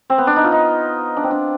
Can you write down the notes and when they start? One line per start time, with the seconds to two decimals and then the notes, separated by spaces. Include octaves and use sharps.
0.10 C4
0.18 B3
0.27 D4
0.36 D#4
0.44 F4
0.52 D#4
1.17 D4
1.24 C4
1.31 D4